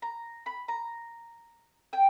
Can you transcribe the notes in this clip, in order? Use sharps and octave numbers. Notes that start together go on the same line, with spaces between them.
A#5
B5
A#5
G5